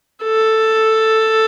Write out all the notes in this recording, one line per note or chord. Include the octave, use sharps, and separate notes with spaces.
A4